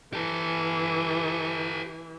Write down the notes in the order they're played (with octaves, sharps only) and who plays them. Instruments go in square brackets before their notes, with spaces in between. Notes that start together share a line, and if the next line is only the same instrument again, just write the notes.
[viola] E3 [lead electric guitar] G4 A4